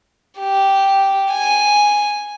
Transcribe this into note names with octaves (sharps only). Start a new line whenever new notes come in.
G4
G#5